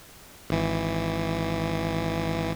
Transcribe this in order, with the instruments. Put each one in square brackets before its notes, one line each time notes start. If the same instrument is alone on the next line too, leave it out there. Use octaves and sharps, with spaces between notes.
[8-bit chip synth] G#1 E3